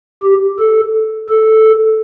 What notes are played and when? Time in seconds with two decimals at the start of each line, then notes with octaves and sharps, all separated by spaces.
0.23 G4
0.59 A4
1.29 A4